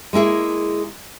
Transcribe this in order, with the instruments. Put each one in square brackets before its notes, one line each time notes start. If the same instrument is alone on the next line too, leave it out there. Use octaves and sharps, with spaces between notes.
[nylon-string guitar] G#3 A#3 E4 G#4